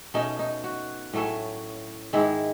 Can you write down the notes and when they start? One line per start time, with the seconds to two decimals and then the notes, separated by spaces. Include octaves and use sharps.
0.14 B2 A3 C#4 D#4
0.39 D#4
0.64 F#4
1.14 A2 F#3 A3 C#4
2.13 G#2 D#3 G#3 E4